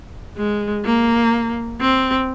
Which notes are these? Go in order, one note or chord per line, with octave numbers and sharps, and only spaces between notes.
G#3
A#3
C4